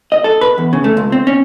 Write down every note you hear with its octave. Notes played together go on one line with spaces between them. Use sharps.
D#5
A4
B4
E2
C#3
A3
C#2
C4
C#4